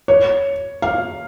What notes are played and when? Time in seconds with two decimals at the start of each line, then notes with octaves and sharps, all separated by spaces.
0.08 C#5
0.82 F5